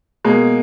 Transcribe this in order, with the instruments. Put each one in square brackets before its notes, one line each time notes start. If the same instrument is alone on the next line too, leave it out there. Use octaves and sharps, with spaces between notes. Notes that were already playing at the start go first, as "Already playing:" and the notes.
[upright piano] B2 G#3 A#3